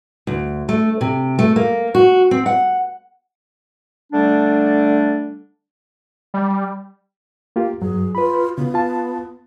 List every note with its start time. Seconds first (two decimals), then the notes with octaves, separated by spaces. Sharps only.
0.27 D2
0.69 A3
1.01 C3
1.39 A3
1.56 A#3
1.95 F#4
2.31 C4
2.46 F#5
4.13 D3 G3 A3 D4
6.34 G3
7.56 A#3 F4 G4
7.82 G2 F#3 G#4
8.15 F4 B4 B5
8.58 C#3 B3 F4
8.74 F4 A5